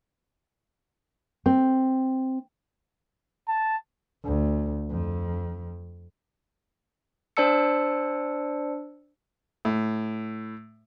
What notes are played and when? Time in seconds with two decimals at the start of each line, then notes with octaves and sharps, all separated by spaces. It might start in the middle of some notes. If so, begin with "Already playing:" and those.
1.46 C4
3.48 A5
4.24 D2
4.90 F2
7.37 D4 C5 D5 A5 E6 C#7
9.65 A2